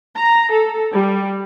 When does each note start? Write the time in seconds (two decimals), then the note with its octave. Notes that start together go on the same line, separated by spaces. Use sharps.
0.18 A#5
0.53 A4
0.92 G3